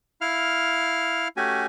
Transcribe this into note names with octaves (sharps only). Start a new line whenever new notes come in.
E4 F5 F6
A3 C#4 F#4 G4 G#5